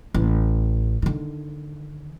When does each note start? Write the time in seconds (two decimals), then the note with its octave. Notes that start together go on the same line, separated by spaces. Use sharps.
0.14 A1
1.02 D3 D#3